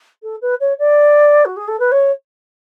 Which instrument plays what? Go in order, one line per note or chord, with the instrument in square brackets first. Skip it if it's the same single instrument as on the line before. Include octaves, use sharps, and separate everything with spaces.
[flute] A4
B4
C#5
D5
F#4
G#4
A4
B4
C#5